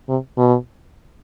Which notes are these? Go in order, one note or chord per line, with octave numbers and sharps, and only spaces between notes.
C3
B2